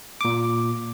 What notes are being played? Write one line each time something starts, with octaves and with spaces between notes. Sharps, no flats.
A#2 D6